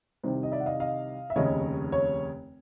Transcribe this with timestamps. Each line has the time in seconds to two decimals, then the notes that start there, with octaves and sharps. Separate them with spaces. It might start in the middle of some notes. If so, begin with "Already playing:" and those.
0.23 C2 C3 D#3 C5
0.43 D#5
0.52 D5 E5
0.60 F#5
0.66 D#5 F5
0.80 D#5 F5
1.30 E5
1.36 F1 D#2 C#3 C#5 D#5
1.92 C#5